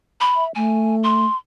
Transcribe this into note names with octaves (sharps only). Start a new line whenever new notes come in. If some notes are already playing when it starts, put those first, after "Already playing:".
B5
E5
A3 G#5
C6